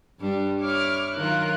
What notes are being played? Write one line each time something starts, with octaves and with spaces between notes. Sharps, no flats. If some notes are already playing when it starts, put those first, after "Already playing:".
G2 G3 D4
E4 C#5 D6 F6
D#3 F#3 F4 A#4 F#6